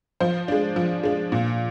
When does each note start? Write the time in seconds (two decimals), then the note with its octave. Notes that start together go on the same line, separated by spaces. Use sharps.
0.20 F3 C5
0.48 G#3 D4
0.76 F3
1.03 G#3 D4
1.32 A#2